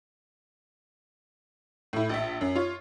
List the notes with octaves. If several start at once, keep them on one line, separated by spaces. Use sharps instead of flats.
A2 E4
A#1 E5
F#2
F4 C#5